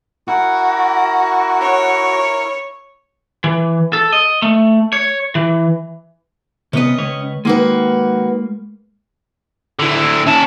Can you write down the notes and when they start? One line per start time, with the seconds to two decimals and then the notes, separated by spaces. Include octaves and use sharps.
0.28 E4 F#4 A#4
1.61 C#5
3.44 E3
3.93 A4
4.12 D#5
4.42 A3
4.93 C#5
5.35 E3
6.73 C3 B3 C#4 B4 D#5
6.98 C#2 B4 C#5
7.45 D#3 G#3 A#3 F#4 B4
9.79 D3 E4
10.26 C#4 A5